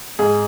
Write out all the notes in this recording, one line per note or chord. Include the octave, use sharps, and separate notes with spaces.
G#2 G#4